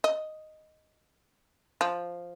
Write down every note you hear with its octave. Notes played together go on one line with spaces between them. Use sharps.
D#5
F3